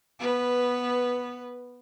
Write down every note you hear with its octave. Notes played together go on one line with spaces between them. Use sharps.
B3 B4